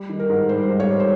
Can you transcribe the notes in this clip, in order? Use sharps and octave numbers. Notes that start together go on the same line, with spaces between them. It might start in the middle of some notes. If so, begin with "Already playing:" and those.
Already playing: G3
D#3
A#4
G#2
G3 C5
G#2
C#5
G3
C5